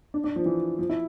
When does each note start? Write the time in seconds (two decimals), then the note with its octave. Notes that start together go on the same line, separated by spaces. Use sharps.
0.14 D4
0.24 D4
0.36 F3
0.46 E3
0.79 F3
0.90 E4